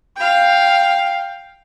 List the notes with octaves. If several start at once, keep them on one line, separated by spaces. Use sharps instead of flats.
F5 G5